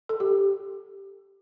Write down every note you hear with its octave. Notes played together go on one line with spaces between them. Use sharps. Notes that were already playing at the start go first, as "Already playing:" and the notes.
A4
G4